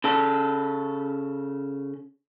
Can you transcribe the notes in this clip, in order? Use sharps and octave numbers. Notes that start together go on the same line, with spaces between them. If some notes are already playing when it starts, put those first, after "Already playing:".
C#3 A4